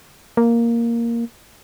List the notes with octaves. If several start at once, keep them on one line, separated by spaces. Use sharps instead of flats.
A#3